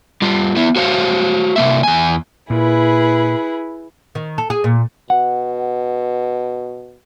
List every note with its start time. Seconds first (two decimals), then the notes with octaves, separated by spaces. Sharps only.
0.22 G3 F4
0.56 B3 E4
0.76 F#4 C5 C#5 F5
1.56 C3 A#3 E5
1.83 E2 G#5
2.50 A#2 E4 G#4 B4
4.15 D#3
4.38 A4
4.50 G#4
4.64 A#2
5.10 B2 F#5